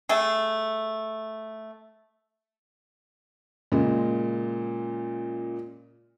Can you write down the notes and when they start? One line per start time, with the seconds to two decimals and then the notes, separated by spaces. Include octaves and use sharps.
0.09 A3 G#4
3.72 A#2 C#3 G#3